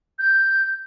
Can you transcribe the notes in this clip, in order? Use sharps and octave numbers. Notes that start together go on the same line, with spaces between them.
G6